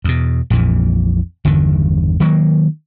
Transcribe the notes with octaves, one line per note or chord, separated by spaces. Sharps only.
E2 B2
A#1 F2 A#2 E3
G1 E2 D3 D#3
D#3 F#3 G3 A#3